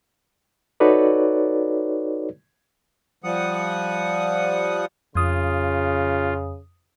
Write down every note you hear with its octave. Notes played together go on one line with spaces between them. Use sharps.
D#4 F#4 A4 B4 C#5 D5
F3 G3 F#5 D#6
F2 C#3 F4 D#6